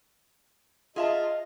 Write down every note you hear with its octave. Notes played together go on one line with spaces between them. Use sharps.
F4 G#4 D#5 E5 A5